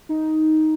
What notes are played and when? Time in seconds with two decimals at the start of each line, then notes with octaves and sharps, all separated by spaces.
0.09 D#4